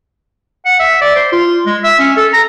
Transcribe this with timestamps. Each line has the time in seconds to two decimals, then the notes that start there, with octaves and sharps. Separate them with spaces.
0.65 F#5
0.79 E5
1.01 D5
1.16 C5
1.32 F4
1.66 G#3
1.84 E5
1.99 C#4
2.17 A4
2.33 A#5